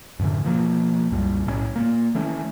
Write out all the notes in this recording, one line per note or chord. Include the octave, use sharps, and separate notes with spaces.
F#2 A2 D3 E3
B2 F3 A#3
C2 F#2 A#2 G3
B1 A2 F#3 C#4
A#2 A#3
D#3 E3 A3 C#4